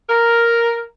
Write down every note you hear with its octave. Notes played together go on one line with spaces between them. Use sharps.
A#4